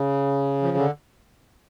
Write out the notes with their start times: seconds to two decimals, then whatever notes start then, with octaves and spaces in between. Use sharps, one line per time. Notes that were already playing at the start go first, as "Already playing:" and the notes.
Already playing: C#3
0.63 F3
0.77 D3